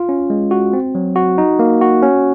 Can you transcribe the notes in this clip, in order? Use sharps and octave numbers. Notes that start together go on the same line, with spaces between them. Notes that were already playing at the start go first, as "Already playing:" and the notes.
Already playing: F4
C#4
G#3
F#4
C4
F#3
F#4
D#4
A#3
F#4
C#4